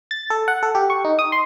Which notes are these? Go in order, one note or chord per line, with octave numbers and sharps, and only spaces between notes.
A6
A4
F#5
A4
G4
C#6
D#4
D#6
C6